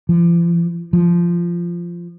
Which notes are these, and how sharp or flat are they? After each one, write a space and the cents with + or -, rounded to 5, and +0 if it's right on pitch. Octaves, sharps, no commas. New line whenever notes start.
F3 -40
F3 -15